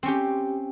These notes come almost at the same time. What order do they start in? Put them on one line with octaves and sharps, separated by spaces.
C4 C#4 G4